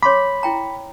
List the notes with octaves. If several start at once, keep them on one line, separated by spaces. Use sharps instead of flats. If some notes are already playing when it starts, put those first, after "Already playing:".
C#5 B5 C6 D6
E4 G5 A#5